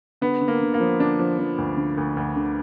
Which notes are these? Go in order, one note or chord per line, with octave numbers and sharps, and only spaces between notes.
D3 B3
D3
A#3
D3
A#3
F3
D3 D4
F3
F3
D2
D3
D2
D2
D3